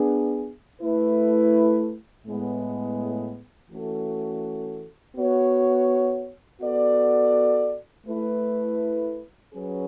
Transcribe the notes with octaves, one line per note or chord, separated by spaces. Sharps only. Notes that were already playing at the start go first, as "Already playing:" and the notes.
Already playing: B3 D4 G#4
A3 E4 B4
A2 G#3 B3
E3 A3 C#4 F#4 A4
B3 F#4 C#5
B3 F#4 A4 D5
A3 E4 B4
F#3 C#4 G#4 B4